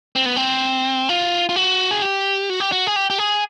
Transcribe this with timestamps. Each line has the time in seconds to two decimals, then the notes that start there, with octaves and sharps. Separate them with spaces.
0.16 C4
0.26 B3
0.36 C4
1.09 F4
1.49 F4
1.56 F#4
1.91 G#4
2.02 G4
2.50 F#4
2.60 G4
2.72 F#4
2.87 G#4
2.96 G4
3.10 G4
3.18 G#4